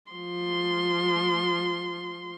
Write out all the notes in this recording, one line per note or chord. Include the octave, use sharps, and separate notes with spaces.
F3 C6